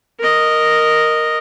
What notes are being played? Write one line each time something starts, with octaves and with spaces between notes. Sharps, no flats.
A#4 D#5